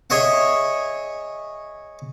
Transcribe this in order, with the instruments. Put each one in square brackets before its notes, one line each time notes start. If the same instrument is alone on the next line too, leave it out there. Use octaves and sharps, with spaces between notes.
[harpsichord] G#4 C#5 D#5 E5 F#5